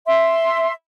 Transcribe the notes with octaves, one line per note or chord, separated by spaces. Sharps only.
E5 C6